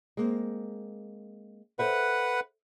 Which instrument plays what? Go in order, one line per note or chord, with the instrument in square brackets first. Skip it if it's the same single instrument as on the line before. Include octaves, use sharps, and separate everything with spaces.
[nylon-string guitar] G#3 A#3 C4
[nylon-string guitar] A4 C5 E5 [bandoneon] B4 F#5